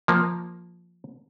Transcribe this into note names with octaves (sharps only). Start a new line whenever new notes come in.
F3 A#3